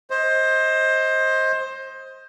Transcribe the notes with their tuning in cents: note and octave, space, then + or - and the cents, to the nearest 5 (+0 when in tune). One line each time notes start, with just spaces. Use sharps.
C5 +20 D#5 +20